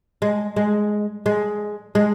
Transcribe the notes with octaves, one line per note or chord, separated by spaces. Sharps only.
G#3
G#3
G#3
G#3